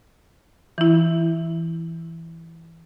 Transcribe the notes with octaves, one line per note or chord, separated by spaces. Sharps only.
E3 E4